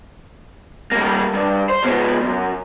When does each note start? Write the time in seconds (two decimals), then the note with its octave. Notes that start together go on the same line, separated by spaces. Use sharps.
0.92 G3 A#3
1.33 G2
1.69 C5
1.83 C#2 B3
2.20 F#2